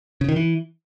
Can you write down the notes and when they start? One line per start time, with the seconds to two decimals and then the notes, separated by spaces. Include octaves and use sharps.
0.21 C#3
0.29 D#3
0.36 E3